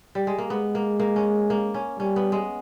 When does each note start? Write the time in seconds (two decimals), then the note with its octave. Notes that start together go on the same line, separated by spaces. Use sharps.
0.15 G3
0.27 G#3
0.38 A#3
0.50 G#3 B3
0.75 A#3
1.00 A#3
1.16 C#4
1.50 A#3
1.74 C#4
1.99 G3 C#4
2.16 B3
2.32 G#3